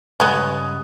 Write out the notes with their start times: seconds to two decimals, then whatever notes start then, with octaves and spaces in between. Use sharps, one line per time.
0.20 G2 C#3 G#3 B3 C#4 D#6 F#6